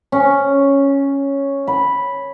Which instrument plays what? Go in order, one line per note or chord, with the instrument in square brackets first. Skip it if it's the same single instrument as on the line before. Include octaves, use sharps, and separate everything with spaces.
[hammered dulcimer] C#4
B5